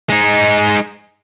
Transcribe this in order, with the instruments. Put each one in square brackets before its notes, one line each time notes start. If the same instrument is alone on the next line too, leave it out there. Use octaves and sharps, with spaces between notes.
[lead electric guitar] G#3 D#4